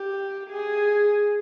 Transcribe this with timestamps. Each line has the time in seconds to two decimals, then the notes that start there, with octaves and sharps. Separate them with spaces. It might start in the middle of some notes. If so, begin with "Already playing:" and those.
Already playing: G4
0.50 G#4